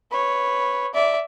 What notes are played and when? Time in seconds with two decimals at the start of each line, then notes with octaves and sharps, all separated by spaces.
0.11 B4 C#5
0.94 D5 E5